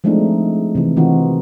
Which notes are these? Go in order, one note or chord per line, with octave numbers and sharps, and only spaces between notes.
F3 G#3 A3 C4 D4 D#4
C3 E3
D#3 E3 C4 D#4 F4 F#4